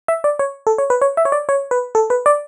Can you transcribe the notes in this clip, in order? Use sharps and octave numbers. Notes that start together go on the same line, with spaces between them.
E5
D5
C#5
A4
C#5
B4
C#5
E5
C#5
D5
C#5
B4
A4
B4
D5